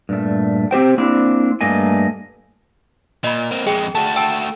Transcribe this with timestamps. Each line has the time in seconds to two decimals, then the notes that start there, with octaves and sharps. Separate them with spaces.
0.09 G2 A#2 A3
0.71 C4 G4 C5 G5
0.98 A#3 C4 D4 E4
1.61 G2 A3 A#3 D#5 G#5
3.24 A#2 D#5 B5
3.51 A#3 C4
3.67 F2 G#3 G#4 G5
3.95 A3 F#4 A5
4.16 G5 E6 D7